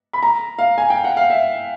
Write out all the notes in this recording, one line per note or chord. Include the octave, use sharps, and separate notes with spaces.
B5
A#5
F5
G#5
G5
F#5
F5
E5